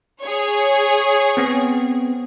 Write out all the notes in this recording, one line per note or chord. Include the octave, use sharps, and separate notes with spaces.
G#4 C#5
B3 C4